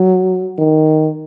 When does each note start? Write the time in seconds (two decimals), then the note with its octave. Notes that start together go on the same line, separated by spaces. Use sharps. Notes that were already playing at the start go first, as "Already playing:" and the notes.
Already playing: F#3
0.58 D#3